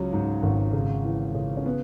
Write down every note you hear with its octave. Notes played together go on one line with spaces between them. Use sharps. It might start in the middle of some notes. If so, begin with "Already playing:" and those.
Already playing: C#2 F#3 C#4
G#2
G#1
C#3
E3
C#3
C#4
B3